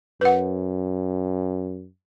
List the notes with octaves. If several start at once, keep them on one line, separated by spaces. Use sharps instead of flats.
F#2 B4 F#5